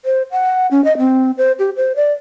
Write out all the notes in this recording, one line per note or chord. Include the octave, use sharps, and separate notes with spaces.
C5
F#5
C#4
D#5
C4
C5
G4
C5
D5